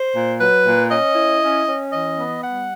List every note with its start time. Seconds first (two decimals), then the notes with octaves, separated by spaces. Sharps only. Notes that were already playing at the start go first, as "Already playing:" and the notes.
Already playing: C5
0.14 A#2
0.40 F#3 B4
0.65 A#2
0.90 C#4 D#5
1.16 E4
1.42 C#4
1.67 C#4
1.92 E3 D#5
2.18 B3
2.44 G3 F#5